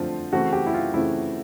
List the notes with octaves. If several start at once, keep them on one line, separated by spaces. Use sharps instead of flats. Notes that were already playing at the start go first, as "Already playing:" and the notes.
Already playing: D3 F3 A3 C4 F4
C#3 E3 A3 C4 F#4
G4
E4
F4
C#3 E3 A3 C4 E4